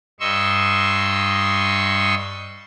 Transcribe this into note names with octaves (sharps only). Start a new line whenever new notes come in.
G2 D#5 C6 C#6 E6